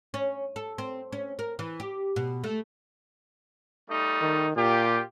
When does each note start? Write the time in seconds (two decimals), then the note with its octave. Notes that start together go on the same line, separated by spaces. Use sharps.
0.14 C#4
0.56 A4
0.78 C4
1.12 C#4
1.39 A#4
1.59 E3
1.80 G4
2.16 B2
2.44 A3
3.90 G3 A3 D#4
4.21 D#3
4.56 A#2 F4 G4